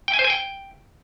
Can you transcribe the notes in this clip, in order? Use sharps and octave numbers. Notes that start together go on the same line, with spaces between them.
G5
G#5
C5
G#5
G5